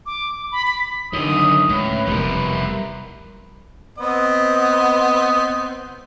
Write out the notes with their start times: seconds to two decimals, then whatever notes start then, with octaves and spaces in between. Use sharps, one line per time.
0.06 D6
0.52 B5
0.67 B6
1.13 F#2 D3 D#3 D#6
1.69 C#2 A2 B4
2.07 F1 E2 B2 G3 A#4
3.98 B3 C4 D#5